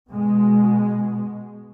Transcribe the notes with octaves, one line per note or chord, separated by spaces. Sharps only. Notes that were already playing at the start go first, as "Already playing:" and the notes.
B2 G#3